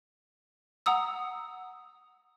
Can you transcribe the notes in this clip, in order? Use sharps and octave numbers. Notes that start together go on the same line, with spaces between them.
F#5 A#5 D#6 E6